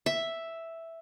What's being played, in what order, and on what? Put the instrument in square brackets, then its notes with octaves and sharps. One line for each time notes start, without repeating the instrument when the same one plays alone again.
[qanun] E5